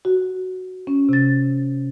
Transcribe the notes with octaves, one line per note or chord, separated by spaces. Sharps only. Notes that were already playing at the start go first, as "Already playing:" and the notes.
F#4
C#4
C3 A6